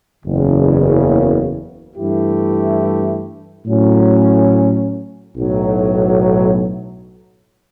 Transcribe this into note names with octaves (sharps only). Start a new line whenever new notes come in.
F#1 E2 C#3
G2 E3 A3 E4 G4
A2 F#3 C#4
B1 A2 F#3